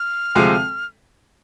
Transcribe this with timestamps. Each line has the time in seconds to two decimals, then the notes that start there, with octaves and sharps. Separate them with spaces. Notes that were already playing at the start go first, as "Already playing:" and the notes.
Already playing: F6
0.35 D2 C3 F3 G#3